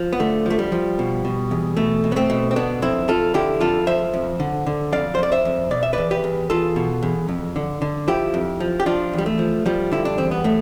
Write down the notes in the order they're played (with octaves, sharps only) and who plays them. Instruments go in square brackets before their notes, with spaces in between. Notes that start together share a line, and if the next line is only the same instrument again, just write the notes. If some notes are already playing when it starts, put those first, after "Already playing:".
Already playing: [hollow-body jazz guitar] F3
B3
D3 A3
F3 A3
G3
F3
B2
B2
E2
B2 A3
B2
B3
A3 C4
B2
C4
D3 B3 D4
F2 C4 E4
F2 F4 A4
D3 E4 G4
F2 F4 A4
F3 C5 E5
F2
D3
D3
F2 D5 F5
C5
F2 D5
C5 E5
F2
B2 D5
E5
E2 B4 D5
G4 B4
E2
E2 F4 A4
B2
E2
F2
D3
D3
F3 E4 G4
F2
F3
G4
F3 D4 F4
E2 G3
A3
F3
F3 G3
D3 E4
D4
E2 C4
B3
A2 A3